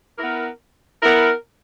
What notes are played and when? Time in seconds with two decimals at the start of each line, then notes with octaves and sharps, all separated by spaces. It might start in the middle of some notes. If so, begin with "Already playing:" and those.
0.19 B3 E4 A#4
1.02 B3 E4 A#4